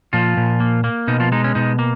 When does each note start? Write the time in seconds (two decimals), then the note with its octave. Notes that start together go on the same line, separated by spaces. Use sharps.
0.13 A#2 F3 F4
0.37 A#2
0.60 A#3
0.84 A#3
1.08 B2 D#4
1.20 F3 F4
1.32 G#3 D#4
1.44 C#4
1.55 B2 D#4
1.79 A#3